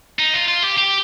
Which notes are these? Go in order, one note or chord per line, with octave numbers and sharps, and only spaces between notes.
D#4
F4
F4
G4
G4